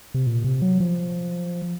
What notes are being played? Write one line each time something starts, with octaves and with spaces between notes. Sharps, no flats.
C3
A#2
C3
F#3
F3